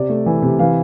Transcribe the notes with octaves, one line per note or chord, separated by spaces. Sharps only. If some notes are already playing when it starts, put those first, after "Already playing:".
Already playing: C3 D5
A3
E3
C3
E3 F5